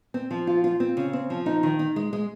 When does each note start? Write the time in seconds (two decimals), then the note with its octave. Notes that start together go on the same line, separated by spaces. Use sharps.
0.14 C4
0.31 F3
0.47 F4
0.64 F4
0.80 C4
0.97 C#3
1.13 C4
1.30 F3
1.46 D#4
1.63 D#3
1.79 D#4
1.96 G#3
2.13 G#3